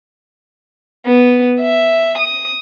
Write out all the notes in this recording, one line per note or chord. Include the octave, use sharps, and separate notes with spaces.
B3
E5
D#6